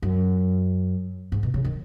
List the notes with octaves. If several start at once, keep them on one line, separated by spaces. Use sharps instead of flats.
F#2
G#2
B2
C#3
D#3